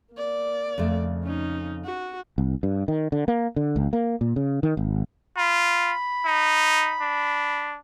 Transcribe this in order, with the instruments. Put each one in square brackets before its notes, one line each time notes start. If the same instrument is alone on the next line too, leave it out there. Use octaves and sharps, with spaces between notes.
[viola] A#3 D5
[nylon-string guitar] F2 C#3 A3
[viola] C#4 D#4
F#4
[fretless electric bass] C2
G2
D#3
D3
A#3
D3
C#2
A#3
A#2
C#3
D#3
G#1
[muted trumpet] F4 [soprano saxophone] B5
[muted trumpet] D#4
D4